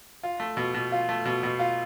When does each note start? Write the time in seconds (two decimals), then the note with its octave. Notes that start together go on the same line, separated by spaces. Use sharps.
0.23 F4
0.40 A3
0.57 B2
0.74 B2
0.92 F4
1.09 A3
1.25 B2
1.43 B2
1.59 F4